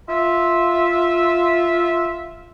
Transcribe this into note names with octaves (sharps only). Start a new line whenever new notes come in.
F4 E5